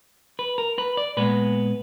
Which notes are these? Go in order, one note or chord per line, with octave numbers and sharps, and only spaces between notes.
B4
A#4
B4
D5
A#2 G#3 B3 B4